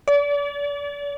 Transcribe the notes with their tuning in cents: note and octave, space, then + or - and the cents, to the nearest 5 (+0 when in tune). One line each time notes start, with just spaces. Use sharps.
D5 -35